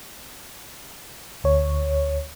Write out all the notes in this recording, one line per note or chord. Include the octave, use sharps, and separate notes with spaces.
D2 C#5